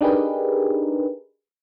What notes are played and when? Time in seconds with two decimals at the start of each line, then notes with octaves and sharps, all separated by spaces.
0.01 D4 D#4 G4 G#4 A#4 B4